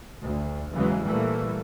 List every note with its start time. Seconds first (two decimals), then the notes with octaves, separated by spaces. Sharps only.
0.23 D2
0.73 E2 C#3 E3 F#3 G#3
1.05 A#2 E3 G3 A3 A#3